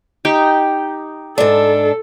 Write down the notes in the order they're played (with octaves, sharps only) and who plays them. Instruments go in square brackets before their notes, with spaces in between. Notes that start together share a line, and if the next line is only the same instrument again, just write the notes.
[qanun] D#4 G4
[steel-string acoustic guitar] G#2 D4 [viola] A4